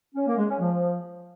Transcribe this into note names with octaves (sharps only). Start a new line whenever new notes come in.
C#4
A#3
G#3
C#4
F3